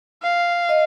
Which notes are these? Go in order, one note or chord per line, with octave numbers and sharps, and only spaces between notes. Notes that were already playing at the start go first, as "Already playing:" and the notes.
F5
D#5